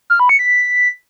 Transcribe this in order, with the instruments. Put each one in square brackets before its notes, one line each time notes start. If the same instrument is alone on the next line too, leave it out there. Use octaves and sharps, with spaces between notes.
[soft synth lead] F6
B5
C#7
B6